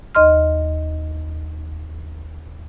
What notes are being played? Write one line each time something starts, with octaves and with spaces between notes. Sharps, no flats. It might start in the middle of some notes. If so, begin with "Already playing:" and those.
D#2 D#5 C6 F6